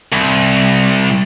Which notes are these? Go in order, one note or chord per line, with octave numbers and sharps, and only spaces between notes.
C2